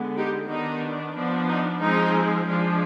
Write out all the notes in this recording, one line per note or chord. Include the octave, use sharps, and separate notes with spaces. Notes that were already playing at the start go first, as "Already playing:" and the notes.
Already playing: D3 G#3 B3
D#4 G4
D#3 B3 D4 D#4
F3 B3 D4
D#4
F3 G#3 C4 D#4
F3 G#3 D4